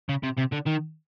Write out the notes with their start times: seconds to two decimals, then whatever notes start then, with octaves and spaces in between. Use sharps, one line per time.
0.09 C#3
0.23 C3
0.37 C3
0.52 D3
0.66 D#3